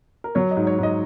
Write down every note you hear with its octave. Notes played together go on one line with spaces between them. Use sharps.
A#4
F#3 C#5
D#5
G#2
C#5
G#2 D#5